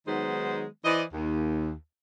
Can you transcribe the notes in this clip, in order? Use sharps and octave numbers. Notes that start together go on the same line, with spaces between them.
D#3 F#3 G#3 B3 D#4 C5
E3 E4 C5 D5 D#5
D#2